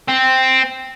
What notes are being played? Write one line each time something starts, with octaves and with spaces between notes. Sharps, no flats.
C4